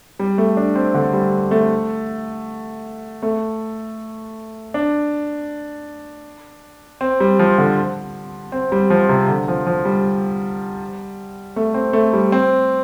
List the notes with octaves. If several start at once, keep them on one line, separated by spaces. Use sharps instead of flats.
G3
A3
D4
C4
D3
G3
A3
A3
D4
C4
G3
F3
D3
C4
G3
F3
C3
D3
F3
F3
G3
A3
C4
A3
G3
C4